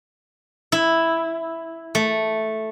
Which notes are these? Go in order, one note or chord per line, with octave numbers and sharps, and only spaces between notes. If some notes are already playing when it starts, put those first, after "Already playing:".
E4
A3